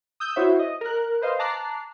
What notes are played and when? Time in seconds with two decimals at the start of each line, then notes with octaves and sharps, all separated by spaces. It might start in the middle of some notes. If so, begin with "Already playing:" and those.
0.20 D#6 E6 G6
0.36 E4 F#4 C5 C#5 E5
0.59 D#5
0.81 A#4 F#6
1.22 B4 C5 D#5 F5
1.39 A5 A#5 D6 F#6 C7